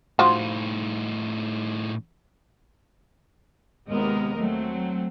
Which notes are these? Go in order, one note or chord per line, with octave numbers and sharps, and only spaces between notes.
A2 F3 D#4 F4 F#4
D#2 C3 G#3 B3 A#4 D#5
F#3 A3 C4